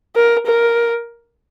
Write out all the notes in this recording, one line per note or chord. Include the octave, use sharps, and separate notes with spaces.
A#4
A#4